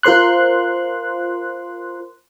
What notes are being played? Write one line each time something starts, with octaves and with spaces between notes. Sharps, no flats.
F4 A#4 C5 C6 F#6